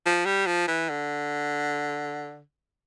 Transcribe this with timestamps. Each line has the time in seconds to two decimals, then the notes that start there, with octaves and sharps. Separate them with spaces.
0.06 F3
0.26 G3
0.47 F3
0.68 E3
0.89 D3